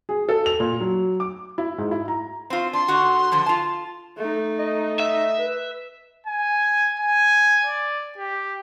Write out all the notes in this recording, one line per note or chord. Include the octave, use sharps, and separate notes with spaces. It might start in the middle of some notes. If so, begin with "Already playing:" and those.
G#4
A4
F7
A#2
F#3
D6
E4
G#2
E4
A#5
C4 F4
D4 C6
D3 F#4
D3 F3
F4 A5
A3 D#4
D#5
E5
B4
G#5
G#5
D5
G4